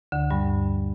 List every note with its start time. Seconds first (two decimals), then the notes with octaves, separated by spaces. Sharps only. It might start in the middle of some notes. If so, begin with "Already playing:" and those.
0.12 D2 D3
0.31 G2 G3